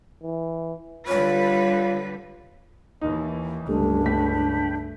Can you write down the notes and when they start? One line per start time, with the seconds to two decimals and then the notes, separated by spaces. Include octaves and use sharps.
0.24 E3
1.08 D3 G3 F4 B4 C#5
3.01 D#2 E3 D#4
3.68 G1 C#2 G3 A3 D4
4.06 A3 G5 B5 B6